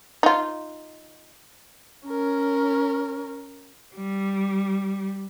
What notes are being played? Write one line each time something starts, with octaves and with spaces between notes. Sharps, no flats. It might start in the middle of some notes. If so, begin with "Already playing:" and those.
D#4 F4
C#4 A#4
G3